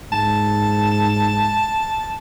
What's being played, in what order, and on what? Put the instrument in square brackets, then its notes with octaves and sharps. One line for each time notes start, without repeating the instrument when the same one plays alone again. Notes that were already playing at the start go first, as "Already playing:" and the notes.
[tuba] G#2 [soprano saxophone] A5